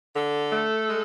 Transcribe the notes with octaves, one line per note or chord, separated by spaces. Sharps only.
D3 A4
A3
G#3